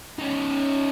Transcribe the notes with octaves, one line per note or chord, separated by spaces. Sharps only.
C#4 D#4